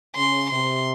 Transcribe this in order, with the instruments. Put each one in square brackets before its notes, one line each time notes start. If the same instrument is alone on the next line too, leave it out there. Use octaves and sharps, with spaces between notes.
[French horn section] C#3 [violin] C6
[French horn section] C3 [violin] C6